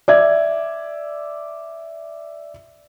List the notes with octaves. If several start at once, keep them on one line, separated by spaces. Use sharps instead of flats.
D5 E5 G#6